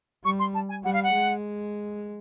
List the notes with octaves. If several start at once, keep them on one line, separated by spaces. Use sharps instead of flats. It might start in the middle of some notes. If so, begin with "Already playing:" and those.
G3 C#6
C6
A5
G#5
G3 F#5
F5
F#5
G#3